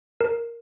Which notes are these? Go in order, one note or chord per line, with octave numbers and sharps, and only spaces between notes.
A#4